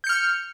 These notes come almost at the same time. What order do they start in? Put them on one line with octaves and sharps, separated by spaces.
G6 C#7 F6